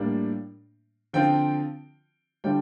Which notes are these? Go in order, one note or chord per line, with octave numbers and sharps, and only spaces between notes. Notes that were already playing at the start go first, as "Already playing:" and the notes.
Already playing: A2 G3 A#3 D4
D3 F3 C4 F4 G5
D3 G3 D4 F4 G5